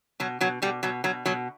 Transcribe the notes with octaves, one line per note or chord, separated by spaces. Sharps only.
B2 F#3
B2 F#3
B2 G3
B2 F#3
B2 F#3
B2 F#3